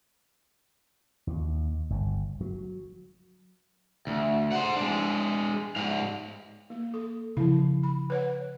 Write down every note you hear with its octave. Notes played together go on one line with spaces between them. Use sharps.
D#2
G1
F#3
D2
C5 F#5
G#3 D4
G#2 F5
A#3
A4
C#3 F3 E4
B5
B4 C#5 F#5